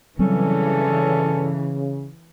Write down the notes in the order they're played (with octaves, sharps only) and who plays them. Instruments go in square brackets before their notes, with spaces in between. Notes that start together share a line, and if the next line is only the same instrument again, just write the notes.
[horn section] G2 C#4 A4 [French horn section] C#3 [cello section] E3 [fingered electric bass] F#3 G3 C4